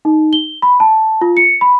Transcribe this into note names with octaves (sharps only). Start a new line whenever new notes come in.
D#4
G7
B5
A5
F4
C#7
B5